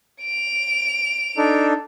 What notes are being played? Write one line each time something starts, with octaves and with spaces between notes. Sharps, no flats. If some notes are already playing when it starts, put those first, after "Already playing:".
D7 F7
D4 D#4 A4